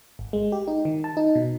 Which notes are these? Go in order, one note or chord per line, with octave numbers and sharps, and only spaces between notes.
G#1
G#3
G4
D#4
D#3
A5
D#4
B2